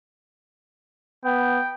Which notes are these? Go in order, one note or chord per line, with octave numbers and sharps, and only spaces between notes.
B3 G5